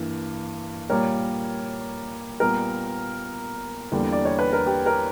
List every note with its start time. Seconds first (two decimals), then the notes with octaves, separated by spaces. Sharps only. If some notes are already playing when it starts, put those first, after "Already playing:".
Already playing: G2 E3 A#3
0.90 A#2 G3 A#3 A#4 C#5
2.40 A#2 G3 B3 A#4
3.92 E2 D3 G3 A#3
4.12 D5
4.25 C#5
4.39 B4
4.53 A#4
4.67 G4
4.86 A#4